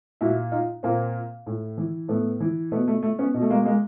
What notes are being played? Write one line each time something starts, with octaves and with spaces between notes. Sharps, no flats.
A#2 E4 F#4
D#4 F4
A#2 A#3 C4
A2
E3
A2 A3 B3
E3
B2 A3 B3
A3
A3
B3 C#4
B2
A3
G#3 A#3
G#3 A#3